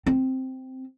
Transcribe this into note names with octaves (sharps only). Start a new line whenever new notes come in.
C4